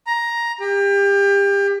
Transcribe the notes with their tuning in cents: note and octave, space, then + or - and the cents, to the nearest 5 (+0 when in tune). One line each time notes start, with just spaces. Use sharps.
A#5 +10
G4 +30